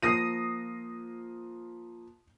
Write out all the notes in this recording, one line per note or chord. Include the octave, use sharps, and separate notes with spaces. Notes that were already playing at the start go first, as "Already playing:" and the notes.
F3 A#3 D#6 A#6 C7 D#7